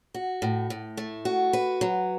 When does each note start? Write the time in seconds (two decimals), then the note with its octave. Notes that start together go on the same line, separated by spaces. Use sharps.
0.14 F#4
0.42 A2
0.70 A2
0.97 A3
1.25 F#4
1.53 B4
1.81 F#3